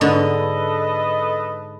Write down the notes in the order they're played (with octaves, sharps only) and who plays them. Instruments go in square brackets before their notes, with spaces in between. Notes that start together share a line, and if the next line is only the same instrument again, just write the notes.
[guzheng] G#2 D3 B3 [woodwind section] A4 B4 D#5